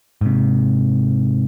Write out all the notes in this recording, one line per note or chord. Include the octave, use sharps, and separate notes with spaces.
G#2 C3